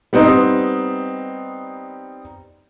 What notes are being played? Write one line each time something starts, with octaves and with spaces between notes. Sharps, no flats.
G3 B3 C4 D#4